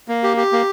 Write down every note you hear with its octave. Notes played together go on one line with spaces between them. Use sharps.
A#3
G4
G4
A#3